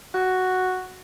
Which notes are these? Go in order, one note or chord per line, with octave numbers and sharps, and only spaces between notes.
F#4